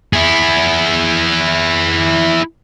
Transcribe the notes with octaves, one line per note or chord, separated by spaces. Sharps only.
E4 G#4